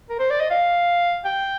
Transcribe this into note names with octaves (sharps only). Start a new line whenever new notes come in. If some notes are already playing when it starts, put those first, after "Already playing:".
A#4
C5
D5
D#5
F5
G5